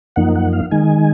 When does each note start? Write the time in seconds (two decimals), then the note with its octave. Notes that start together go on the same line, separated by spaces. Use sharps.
0.16 F#2 F3 A#3 D#4 F#5
0.36 F#5
0.53 F5
0.71 D#3 G#3 D#4 G#5